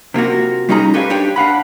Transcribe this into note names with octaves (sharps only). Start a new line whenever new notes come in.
C3 A#3 F4 F#4
G3 C#4 D#4 F4 G#4 A#5
G4 A4 B4 C#5 D5 F5
D4 G4 C#5 G5
D4 F5 F#5 B5